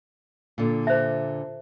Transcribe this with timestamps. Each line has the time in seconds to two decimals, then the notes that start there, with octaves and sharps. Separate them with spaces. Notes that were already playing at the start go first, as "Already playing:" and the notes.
0.58 A#2 D3
0.87 C5 E5